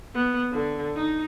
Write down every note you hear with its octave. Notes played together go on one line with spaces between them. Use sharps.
B3
D3
D#4